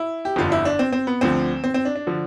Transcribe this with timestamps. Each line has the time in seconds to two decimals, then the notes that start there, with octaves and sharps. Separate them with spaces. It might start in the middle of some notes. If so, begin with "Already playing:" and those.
Already playing: E4
0.25 G4
0.36 G1 F2 D3 F4
0.52 E4
0.65 D4
0.79 C4
0.93 C4
1.07 B3
1.21 D2 D3 F3 C4
1.64 C4
1.74 C4
1.85 D4
1.96 D4
2.07 D3 F3